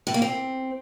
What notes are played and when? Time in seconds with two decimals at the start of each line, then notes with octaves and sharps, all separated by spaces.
0.07 A2
0.14 A#3
0.22 C4